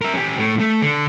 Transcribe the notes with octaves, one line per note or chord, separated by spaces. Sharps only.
A#4 E5
C#4 G4
A2
A3
D3